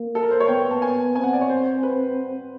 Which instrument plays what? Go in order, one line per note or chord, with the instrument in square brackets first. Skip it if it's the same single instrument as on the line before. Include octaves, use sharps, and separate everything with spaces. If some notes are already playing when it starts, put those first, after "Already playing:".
Already playing: [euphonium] A#3
[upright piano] A4
A#4
C5
C#5
[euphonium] B3 [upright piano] G5
[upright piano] A5
G#5
[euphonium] C4 [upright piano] G#5
[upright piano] F#5
D5
C#5
C5
B4